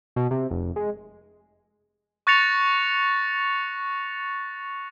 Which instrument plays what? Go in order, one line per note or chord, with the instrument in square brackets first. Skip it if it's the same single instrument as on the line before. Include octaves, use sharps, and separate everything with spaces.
[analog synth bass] B2
C3
F1
G#3
[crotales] C#6 F#6 A6 A#6 C#7 F7